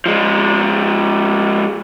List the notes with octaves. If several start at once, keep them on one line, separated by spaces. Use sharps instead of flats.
F3 G#3